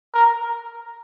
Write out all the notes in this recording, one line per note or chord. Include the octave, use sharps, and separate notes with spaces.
A#4